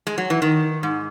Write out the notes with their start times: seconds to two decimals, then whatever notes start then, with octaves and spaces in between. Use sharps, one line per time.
0.07 G#3
0.18 F#3
0.30 E3
0.42 D#3
0.83 G#2